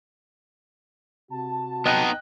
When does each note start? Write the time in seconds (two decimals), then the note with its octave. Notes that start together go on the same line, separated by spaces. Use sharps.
1.30 C3 F#4 A5
1.86 B3 D#4 D#5 G5 F#6